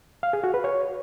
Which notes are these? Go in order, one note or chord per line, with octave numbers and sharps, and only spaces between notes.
F5
G#4
F#4
B4
C#5